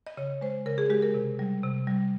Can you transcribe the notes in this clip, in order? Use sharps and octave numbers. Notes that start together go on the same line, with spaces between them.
D#5
C#3 C#5
G#3 C5
C#3 A#4
G#4
G#3 G4
A#4
C3
G3
C3
G3